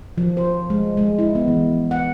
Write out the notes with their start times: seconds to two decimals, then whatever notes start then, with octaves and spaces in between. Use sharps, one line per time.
0.18 F3
0.37 C5
0.70 G#3
0.97 G#3
1.19 E4
1.35 B3
1.48 E3
1.91 F#5